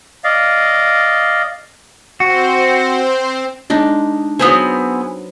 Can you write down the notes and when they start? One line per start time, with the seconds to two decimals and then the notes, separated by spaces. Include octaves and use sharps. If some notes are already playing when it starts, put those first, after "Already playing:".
0.24 D5 D#5 F5
2.20 C4 F#4 C5
3.70 G#3 D4 D#4
4.39 F#3 B3 C4 G#4 B4 C5